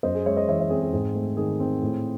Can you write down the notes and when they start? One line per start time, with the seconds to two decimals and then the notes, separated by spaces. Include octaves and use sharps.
0.03 F#2 C5 D#5
0.15 G#4
0.26 G#3 C#5 E5
0.37 C5 D#5
0.48 E3 C#5 E5
0.59 C#5 E5
0.70 C4 G#4 C5
0.82 G#4
0.93 G#2 G#4
1.15 A3
1.37 D#3 G#4
1.60 C4
1.82 A2